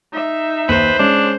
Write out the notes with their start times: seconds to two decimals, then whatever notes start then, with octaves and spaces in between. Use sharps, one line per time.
0.12 D#4 E5
0.69 D#2 B4 C5
0.99 G#3 C#4 D4